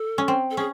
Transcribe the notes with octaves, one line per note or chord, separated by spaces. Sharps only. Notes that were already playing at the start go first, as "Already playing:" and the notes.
Already playing: A4
C#4
C4
A4
C#4 G#4